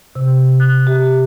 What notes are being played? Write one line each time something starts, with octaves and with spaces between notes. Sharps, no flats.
C3
F#6
G4